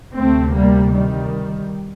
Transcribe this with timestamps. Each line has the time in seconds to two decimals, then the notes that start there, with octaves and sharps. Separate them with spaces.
0.17 D2 C3 A3 C4
0.55 G3 A#3
0.93 D#3 G3